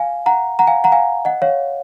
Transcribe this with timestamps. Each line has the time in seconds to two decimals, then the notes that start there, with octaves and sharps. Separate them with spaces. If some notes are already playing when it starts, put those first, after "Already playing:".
Already playing: F5 G#5
0.26 F#5 A#5
0.59 F#5 A#5
0.67 F5 G#5
0.84 F#5 A#5
0.92 F5 G#5
1.25 D#5 F#5
1.42 C#5 F5